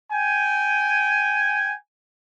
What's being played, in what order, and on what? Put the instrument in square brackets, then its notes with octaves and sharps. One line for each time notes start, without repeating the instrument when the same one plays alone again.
[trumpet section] G5 G#5